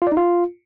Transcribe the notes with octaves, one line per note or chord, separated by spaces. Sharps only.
F4
D5
D#4
F4